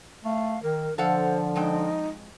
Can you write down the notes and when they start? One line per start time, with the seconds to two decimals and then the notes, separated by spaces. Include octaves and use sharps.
0.25 A3 F5
0.63 D#3 A#4
0.98 D3 F3 A4 C5 F5 F#5
1.56 F2 G#3 D#4 G5